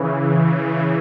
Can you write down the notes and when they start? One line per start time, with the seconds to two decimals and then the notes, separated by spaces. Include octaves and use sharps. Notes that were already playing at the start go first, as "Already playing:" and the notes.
Already playing: C#3 E3
0.13 C#3